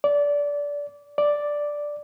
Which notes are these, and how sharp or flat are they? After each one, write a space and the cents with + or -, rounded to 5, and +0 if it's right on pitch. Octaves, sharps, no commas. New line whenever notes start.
D5 -20
D5 +0